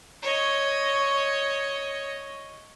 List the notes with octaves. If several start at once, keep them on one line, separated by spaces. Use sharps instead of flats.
C#5 D#5